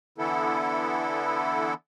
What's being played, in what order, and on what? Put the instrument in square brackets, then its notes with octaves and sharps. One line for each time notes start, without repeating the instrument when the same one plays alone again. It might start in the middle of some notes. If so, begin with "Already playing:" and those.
[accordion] D3 E3 B3 E4 A4